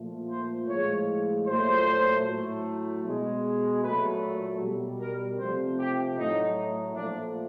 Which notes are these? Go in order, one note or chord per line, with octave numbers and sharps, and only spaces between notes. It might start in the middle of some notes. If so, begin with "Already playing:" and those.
Already playing: A#2 F3 A3
C5
A2 F3 G#3 C#5
A#2 F#3 A3 C5
A2 F#3 A3
B2 G#3
A#2 F#3 A3 B4
B2 G3
A#4
C3 F3 A3 C5
G4
A2 F#3 A3 D#4
A#2 F3 A3 D4